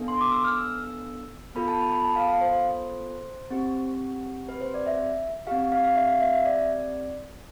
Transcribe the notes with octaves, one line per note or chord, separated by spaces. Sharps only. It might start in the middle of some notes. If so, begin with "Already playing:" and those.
Already playing: B3 D4 A4
C6
D6
E6
F6
E6
B3 F4 A4 B5
A5
B5
B5
A5
F5
F5
C5
C5
C4 G4
B4
C5
D5
E5
C4 G4 F5
F5
F5
E5
F5
E5
E5
D5